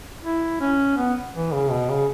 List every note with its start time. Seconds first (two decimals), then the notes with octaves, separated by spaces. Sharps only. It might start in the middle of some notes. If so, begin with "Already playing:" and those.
0.23 E4
0.61 C#4
0.97 B3
1.34 E3
1.52 C#3
1.70 B2
1.89 C#3